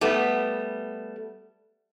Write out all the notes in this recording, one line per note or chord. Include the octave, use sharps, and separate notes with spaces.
G3 A3 B3